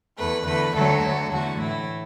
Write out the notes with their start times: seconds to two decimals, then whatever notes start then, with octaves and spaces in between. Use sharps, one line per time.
0.18 E2 E3 A3 B4
0.46 E2 D3 A3 B4
0.75 D2 D3 F#3 A3 A4
1.04 D2 D3 F#3
1.31 E2 D3 F#3 A3 F#4
1.60 A2 E3 A3 E4